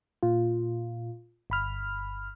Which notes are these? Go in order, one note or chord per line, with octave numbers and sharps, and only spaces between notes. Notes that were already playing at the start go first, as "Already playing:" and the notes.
A#2 F4
G1 B5 F6